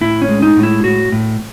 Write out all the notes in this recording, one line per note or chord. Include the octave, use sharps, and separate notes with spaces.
A2 E4
C#4
G#3
D#4
A2
E4
A2 F#4
A2